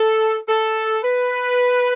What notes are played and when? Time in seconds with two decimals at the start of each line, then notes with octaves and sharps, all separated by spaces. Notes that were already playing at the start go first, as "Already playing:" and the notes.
Already playing: A4
0.48 A4
1.04 B4